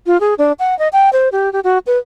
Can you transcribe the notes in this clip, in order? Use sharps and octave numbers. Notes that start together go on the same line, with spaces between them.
F4
G#4
D4
F#5
D#5
G5
C5
G4
G4
F#4
B4